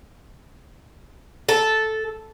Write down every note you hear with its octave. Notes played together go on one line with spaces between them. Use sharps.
A4